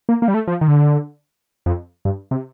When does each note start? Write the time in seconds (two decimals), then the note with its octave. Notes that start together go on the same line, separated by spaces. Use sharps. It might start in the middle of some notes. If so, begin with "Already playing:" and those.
0.09 A#3
0.22 A#3
0.28 G3
0.34 A3
0.47 F3
0.61 D#3
0.68 D3
1.66 F2
2.05 G2
2.31 C3